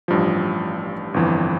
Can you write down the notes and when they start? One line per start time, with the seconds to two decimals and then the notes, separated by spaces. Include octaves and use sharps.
0.08 A1 G2 F3
1.14 G1 F2 E3